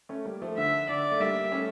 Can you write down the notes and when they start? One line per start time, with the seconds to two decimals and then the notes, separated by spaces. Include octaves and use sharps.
0.09 A3 C#4
0.25 G3 A#3
0.42 F3 A3
0.57 D3 E5
0.89 D3 D5
1.12 A3
1.20 G3 A#3 E5
1.52 A3 C#4